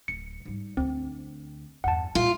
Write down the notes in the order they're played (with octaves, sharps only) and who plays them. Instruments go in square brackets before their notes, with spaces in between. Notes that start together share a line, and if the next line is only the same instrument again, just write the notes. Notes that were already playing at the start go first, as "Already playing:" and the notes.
[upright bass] D1 [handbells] C#7
[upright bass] G#2 G3
[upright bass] D2 D4 [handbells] C4
[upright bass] E2 G2 [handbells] F#5 A5
[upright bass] B1 A#2 [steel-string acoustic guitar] F4